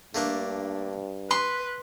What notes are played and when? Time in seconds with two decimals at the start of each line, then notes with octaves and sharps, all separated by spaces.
0.15 G2 A3 A#3 D4
1.31 B4 C6 C#6